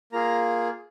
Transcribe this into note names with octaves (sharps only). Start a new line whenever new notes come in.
A#3 F4 G#4 A#5